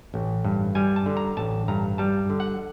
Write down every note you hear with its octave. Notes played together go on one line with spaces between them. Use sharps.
A1
G2
G3 G#5
A5
D3
A#5
A1 A5
G2 A#5
G3 A5
D3
F#5